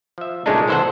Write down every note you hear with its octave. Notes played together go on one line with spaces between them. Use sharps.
F3 E5
A#2 C#3 G#3 A3 D4 D#4
C2 E3 A4 C5 E5 F#5